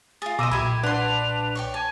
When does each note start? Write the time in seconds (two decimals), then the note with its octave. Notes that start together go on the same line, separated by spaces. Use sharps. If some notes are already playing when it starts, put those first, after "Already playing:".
0.22 F4 G#4 A6
0.39 B2 D#5 A#5 C6 D6 E6 D#7
0.51 B1 A#2 G4 E5 B5 G#6
0.83 D4 B4 F#5 C6 F7
1.55 C#5 D5 G5
1.74 G#5 A5